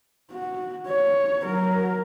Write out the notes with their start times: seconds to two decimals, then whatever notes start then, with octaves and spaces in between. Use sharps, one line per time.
0.32 F#4
0.88 C#5
1.43 F#3 A#4